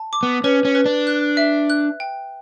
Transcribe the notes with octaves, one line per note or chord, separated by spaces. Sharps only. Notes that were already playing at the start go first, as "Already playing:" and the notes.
Already playing: A5
D6
B3
C#4 B4
C#4
B4
D4
F#6
E5
F#6
G5